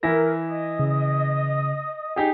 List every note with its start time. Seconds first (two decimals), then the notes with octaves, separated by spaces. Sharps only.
0.03 E3 E4 A#4 A#6
0.49 D#5 D#6
0.79 C#3
2.16 D#4 G4 G#4